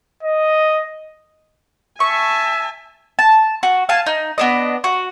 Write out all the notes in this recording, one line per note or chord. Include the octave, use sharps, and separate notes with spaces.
D#5
E5 G#5 A5 C#6
A5
F#4
F5 G#5 A5
D#4
B3 D4 D#5
F#4